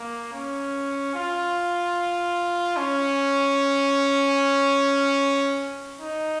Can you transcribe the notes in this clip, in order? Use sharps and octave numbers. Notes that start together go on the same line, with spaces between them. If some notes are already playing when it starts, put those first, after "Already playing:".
Already playing: A#3
C#4
F4
C#4
D#4